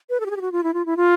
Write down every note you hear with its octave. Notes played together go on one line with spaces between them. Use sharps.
B4
A4
G4
G#4
G4
F#4
F4
E4
F4
E4
F4